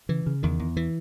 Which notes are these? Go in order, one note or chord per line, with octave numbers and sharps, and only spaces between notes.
C#3 E3
C#3
E2 D#3
E2
E3